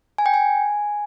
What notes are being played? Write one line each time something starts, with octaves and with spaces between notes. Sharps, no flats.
G#5
G5
G#5